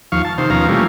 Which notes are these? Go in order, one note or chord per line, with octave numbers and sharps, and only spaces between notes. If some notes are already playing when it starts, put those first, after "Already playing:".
D#2 F3 F5 C#6
A5
C3 D#3 C5
D#2 B2 F3 C#4 F5 A#5
E3 G3 A3 A#3 C#4 F4